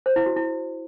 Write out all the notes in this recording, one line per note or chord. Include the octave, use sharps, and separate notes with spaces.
C5
E4
F#4
E4